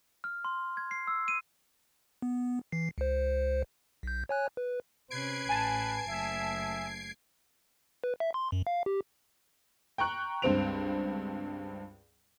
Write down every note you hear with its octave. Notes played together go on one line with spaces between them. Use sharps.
F6
C6
G#6
C7
E6
D#7
B3
E3 C7
C#2 C5
B1 G6
C#5 G#5 F#6
B4
C3 C#4 B4 G#6 C7 D7
A1 G#5 A5
F#1 A3 E5
B4
E5
C6
F#2
F5
G4
G5 A#5 C#6 F#6
C#2 G2 C4 C5 D7 F7